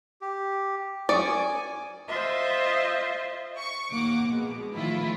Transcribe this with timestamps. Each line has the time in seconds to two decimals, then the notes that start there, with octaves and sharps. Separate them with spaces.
0.21 G4
1.09 F#2 D5 C#6 D#6
1.25 G#5
2.08 F4 C5 D#5 E5
3.58 C#6
3.91 A#1 D#2 A#3 F#5 D6
4.25 A#1 B2 G#3
4.73 A2 D#3 F3 E4 F4